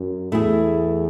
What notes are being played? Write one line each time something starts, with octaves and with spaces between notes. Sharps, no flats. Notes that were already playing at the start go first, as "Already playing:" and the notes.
Already playing: F#2
E2 A3 E4 G#4